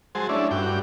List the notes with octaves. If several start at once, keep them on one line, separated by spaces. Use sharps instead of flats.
F#3 G#3 G#4 C5 A5
A3 C#4 D4 E4
G2 F#4 G5 D6